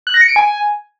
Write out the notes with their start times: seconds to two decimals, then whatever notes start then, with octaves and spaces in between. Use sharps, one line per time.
0.07 F#6
0.14 A#6
0.21 C#7
0.29 D7
0.36 G#5